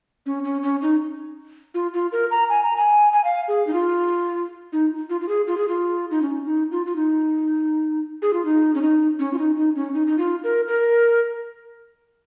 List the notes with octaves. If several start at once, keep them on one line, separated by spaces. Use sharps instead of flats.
C#4
C#4
C#4
D#4
F4
F4
A#4
A#5
G#5
A#5
G#5
G#5
F5
G#4
D#4
F4
D#4
F4
F4
G#4
F4
G#4
F4
D#4
C#4
D#4
F4
F4
D#4
G#4
F4
D#4
C#4
D#4
C#4
F4
D#4
D#4
C#4
D#4
D#4
F4
A#4
A#4